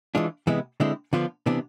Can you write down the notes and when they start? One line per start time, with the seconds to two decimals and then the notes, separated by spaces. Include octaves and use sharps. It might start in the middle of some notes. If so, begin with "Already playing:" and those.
0.15 E3 G#3 D4 F4
0.47 C3 E3 G#3 B3 E4
0.80 D3 G#3 C4 E4
1.13 D3 F3 B3 D4 F4
1.46 C3 E3 B3 D4